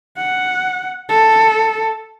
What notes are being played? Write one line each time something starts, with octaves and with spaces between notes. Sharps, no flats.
F#5
A4